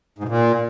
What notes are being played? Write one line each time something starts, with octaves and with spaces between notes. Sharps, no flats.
G#2
B2
A#2